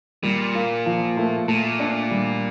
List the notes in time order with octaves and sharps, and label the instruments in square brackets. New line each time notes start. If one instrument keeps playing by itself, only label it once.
[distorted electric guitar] A#2 [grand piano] G3
[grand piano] A#3
F3
A3
[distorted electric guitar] A#2 [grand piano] A3
[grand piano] D4
G3